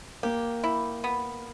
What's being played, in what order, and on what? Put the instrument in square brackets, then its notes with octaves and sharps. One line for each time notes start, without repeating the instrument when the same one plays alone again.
[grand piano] A#3 [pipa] G4
[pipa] E4
B3